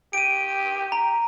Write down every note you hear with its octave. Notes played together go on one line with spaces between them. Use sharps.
G4 D7 D#7
A#5